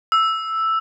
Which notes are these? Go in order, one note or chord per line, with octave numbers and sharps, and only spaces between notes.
E6